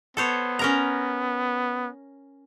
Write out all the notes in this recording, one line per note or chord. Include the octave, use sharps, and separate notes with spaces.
B3 A4 C5 C#5
C#4 A#4 A#5